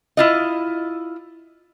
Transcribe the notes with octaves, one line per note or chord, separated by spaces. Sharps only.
E4 F4 D#5